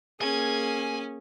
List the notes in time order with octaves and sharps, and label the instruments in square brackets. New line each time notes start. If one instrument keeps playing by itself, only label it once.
[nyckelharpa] A#3 G#4 [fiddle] C#4 [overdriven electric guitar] G#5